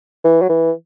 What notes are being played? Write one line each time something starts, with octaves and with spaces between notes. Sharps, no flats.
E3
F#3
E3